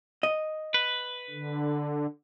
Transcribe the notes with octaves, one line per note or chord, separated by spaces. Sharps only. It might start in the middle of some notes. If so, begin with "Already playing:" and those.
D#5
B4
D3